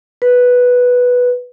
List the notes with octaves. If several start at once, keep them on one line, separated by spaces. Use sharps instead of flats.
B4